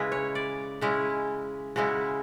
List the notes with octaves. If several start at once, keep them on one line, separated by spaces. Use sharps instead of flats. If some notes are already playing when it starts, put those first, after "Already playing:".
Already playing: C#3 G#3 C#4 E4 B4
C#5
D5
C#3 G#3 C#4 E4
C#3 G#3 C#4 E4 F#4